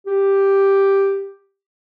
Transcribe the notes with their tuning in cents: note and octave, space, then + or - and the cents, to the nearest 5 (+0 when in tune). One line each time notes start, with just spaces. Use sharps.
G4 +0